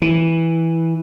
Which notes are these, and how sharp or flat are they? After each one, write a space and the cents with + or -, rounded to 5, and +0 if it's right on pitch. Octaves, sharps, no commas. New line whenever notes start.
E3 -5